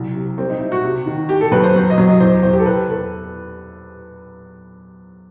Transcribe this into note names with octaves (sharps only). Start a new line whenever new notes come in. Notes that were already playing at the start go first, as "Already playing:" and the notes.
Already playing: C2 F#3
C3
G3 C4
D#4
G3 E4
F#4
C3
D#3
E3 G4
A4
F#2 B4
C5
F#3 C5
D#5
F#3
D#5
E2 C5
E2 C5
G4
A4
E2 B4
E2 A4